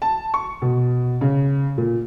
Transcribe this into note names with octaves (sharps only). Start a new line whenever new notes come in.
A5
C#6
B2
C#3
A#2